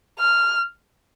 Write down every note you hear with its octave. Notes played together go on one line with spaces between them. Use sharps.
F6